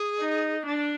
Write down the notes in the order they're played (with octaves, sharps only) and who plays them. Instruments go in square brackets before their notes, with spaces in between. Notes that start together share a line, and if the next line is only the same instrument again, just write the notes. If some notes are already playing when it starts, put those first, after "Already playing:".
Already playing: [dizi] G#4
[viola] D#4
D4